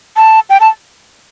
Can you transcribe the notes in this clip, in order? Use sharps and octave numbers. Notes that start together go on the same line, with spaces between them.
A5
G5
A5